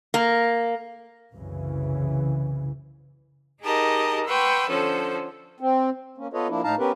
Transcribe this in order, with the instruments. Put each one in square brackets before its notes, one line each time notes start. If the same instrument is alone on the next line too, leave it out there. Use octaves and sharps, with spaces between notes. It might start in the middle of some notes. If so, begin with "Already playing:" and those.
[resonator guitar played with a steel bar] A#3
[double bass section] C2 F#2 C#3 E3
[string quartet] D#4 G4 G#4 A#4 D#5 A5
B4 F#5 G5 C6 C#6 E6
D3 F3 C#4 A4 C5
[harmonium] C4
A#3 C#4
B3 F4 A4 B4 C#5 D#5
F3 A#3 D4 E4
A2 D#4 F5 A5 A#5
B3 C#4 G4 A#4 B4